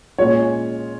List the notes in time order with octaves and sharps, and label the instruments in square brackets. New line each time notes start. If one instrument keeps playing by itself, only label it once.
[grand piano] A#2 G#3 C#4 F4 [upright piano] C#5